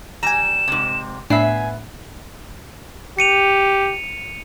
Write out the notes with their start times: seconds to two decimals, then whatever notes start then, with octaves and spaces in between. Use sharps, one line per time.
0.23 G3 G#5 A#5 E7
0.68 G#2 C3
1.30 A2 B3 D4 E5 G#5 C7
3.19 G4 C#7 D#7 F7